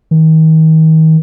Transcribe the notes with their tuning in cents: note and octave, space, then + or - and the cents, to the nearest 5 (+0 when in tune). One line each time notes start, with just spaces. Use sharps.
D#3 +35